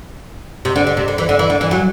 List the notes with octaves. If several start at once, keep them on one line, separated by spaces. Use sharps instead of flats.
C3
D3
D3
C3
D3
E3
D3
E3
D3
E3
F#3